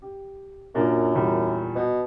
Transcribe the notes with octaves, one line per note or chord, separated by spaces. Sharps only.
G4
F#2 A#2 A#3 D4
E2 A#2 G3
B2